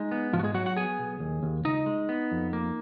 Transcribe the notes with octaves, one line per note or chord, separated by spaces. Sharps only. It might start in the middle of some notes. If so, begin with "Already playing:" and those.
Already playing: G#3 D#4
B3
G#2 F3 F4
F#4
G#3 G#4
F#3 F#4 F#5
F#4 F#5
B3 G#4 G#5
B1
D#2
D#2
C#2 D#4 D#5
G#3
B3
F2
A#3